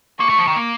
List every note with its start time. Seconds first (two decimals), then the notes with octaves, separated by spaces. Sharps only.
0.20 A#3 C#6
0.29 A3
0.39 F3
0.47 D#3
0.56 A#3